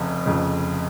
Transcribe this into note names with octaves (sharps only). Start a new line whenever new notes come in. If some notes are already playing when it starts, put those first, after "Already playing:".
Already playing: F1 F2 C#3
F1 F2 C#3